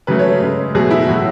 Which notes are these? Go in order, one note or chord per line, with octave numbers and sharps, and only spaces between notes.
C#3 F#3 A3 B4
C#5
C#3 G#3
B2 F#3 A3 G#4
E4
A2 F#3 A3 F#4